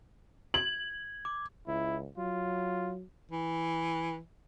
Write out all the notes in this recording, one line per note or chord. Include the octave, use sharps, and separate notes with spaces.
G#6 F#7
D6
C#2 E4
F#3 F4
E3